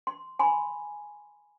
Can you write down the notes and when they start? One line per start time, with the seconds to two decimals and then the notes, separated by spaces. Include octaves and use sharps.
0.07 C6
0.39 G#5 B5 C6